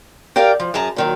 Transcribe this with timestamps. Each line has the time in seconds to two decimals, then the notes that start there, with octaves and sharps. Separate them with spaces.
0.36 G4 A#4 D5 F5
0.60 F3
0.74 F#2 G#4 A5 A#5
0.96 A#2 D#3 F#3